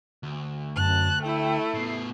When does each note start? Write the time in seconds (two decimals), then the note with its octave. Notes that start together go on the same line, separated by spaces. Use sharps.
0.23 D2
0.76 F#2 A5 F#6
1.22 A3 E4 G5
1.74 A2 B3 C7